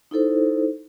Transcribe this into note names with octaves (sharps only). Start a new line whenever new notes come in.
D#4 E4 A4 C5